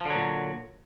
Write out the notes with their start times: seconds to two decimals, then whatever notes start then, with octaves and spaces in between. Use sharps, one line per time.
0.01 F3
0.05 D3
0.10 F#3
0.15 A#2